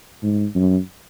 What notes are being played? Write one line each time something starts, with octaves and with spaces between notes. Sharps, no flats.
G#2
F#2